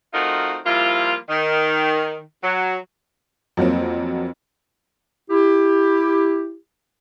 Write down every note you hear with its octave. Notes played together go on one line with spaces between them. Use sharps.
A3 C4 D#4 F4 F#4 A#4
F3 G3 A#3 E4 F4
D#3
F#3
F2 F#3 A#3 C4
E4 G4